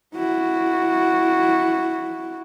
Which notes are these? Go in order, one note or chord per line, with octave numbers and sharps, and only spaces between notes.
E4 F#4